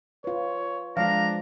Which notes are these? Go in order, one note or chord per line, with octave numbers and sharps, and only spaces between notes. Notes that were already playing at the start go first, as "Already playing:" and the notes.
F4 B4 C#5
F3 G#3 D4 F4 F5 A#5